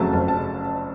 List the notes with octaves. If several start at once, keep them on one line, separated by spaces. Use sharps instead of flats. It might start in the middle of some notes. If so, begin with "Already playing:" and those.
Already playing: F#1 F2 C#3 F#3 A3 A5
F#1 A5
A5
C#3